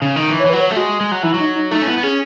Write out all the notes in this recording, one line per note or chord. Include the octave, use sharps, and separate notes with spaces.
C#3
D#3
E3
C#5
E3
F#3 B4
C#5
A3
G#3 F#4
G#3
F#3
E3 E4
F#3
D#4
D#4
A3 D#4
C#4
B3 E4
B3
C#4 G#4